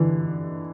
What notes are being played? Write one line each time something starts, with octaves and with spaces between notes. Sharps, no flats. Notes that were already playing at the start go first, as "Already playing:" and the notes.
Already playing: D3 E3